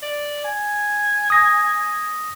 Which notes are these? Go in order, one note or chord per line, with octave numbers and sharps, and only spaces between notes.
D5
G#5
D#6 A#6